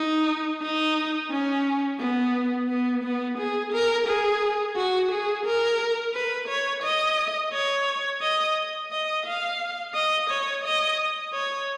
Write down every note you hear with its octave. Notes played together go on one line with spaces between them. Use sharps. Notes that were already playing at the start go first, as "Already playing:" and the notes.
Already playing: D#4
D#4
C#4
B3
B3
B3
G#4
A#4
G#4
F#4
G#4
A#4
B4
C#5
D#5
C#5
D#5
D#5
F5
D#5
C#5
D#5
C#5